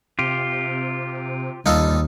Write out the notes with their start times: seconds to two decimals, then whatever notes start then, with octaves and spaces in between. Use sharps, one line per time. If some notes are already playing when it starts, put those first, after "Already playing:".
0.19 C3 F4 G4
1.66 D#2 G3 D#4 F4 A4